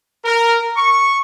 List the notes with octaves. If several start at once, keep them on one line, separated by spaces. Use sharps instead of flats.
A#4
C#6